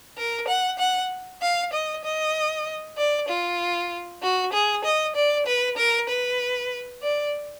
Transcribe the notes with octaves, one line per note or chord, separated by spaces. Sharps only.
A#4
F#5
F#5
F5
D#5
D#5
D5
F4
F#4
G#4
D#5
D5
B4
A#4
B4
D5